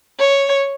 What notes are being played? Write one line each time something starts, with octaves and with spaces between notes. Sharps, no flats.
C#5